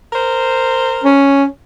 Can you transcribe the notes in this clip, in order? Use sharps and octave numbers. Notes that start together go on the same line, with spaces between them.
A#4 C5
C#4